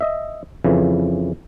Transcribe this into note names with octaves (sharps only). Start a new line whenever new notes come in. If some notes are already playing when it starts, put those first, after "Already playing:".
D#5 E5
F2 C#3 E3